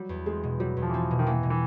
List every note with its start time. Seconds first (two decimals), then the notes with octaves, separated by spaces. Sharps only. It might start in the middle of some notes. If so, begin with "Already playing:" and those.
Already playing: F#3 G3
0.09 E2
0.26 G#3 C4
0.43 B2
0.60 F#3 G3
0.77 E2
0.82 F3
0.89 E3
0.94 F3 C4
1.11 B2
1.19 D#3
1.27 E3 A#3
1.43 B2
1.50 E3